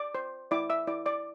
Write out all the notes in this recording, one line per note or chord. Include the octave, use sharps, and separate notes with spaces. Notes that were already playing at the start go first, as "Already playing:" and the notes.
Already playing: D5 D6
C5
E4 D5 D6
E5 E6
E4 D5 D6
D5 D6